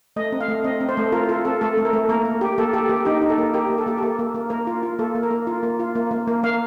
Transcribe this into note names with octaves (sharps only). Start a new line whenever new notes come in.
A3 D#5
C4
F5
A3
C4 D#5
C4
C5
A3
F4 A#4
F4 A4
C4 A4
A3 A4
A3
A#4
A3
A#3 A#4
A#3
G4
A#3 A4
G4 A4
A#3 G4
D#4 G4
D#4
A4
A#3
G4 A#4
A#3
A4
A#3 G4
A4
A#3
A#3
A#3
A#3 A#4
F4
F4
A#3 A4
A#3
A#4
A#3
F4
A#3
F4
A#3
A#3
A#3
A#3 F5